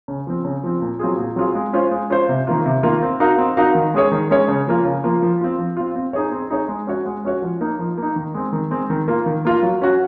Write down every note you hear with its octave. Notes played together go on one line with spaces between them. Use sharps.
C#3
F3 C4
C#3
F3 C4
A#2
F#3 C4 F4 G#4
A#2
F#3 C4 F4 G#4
G#3
C#4 F4 C5
G#3
C#4 F4 C5
C3
D#3 A#3 F4
C3
D#3 A#3 F4
C4
D#4 F#4 A#4 F5
C4
D#4 F#4 A#4 F5
D#3
G#3 C#4 G#4 C#5
D#3
G#3 C#4 G#4 C#5
C#3
F3 A#3 F4
C#3
F3 A#3 F4
F3
C4 F4
F3
C4 F4
C4
D#4 G#4 C#5
C4
D#4 G#4 C#5
G#3
C#4 F#4 C#5
G#3
C#4 F#4 C#5
F3
A#3 D#4
F3
A#3 D#4
D#3
G#3 C4
D#3
G#3 C4
D#3
A#3 F4 A#4
D#3
A#3 F4 A#4
F#3
C#4 F#4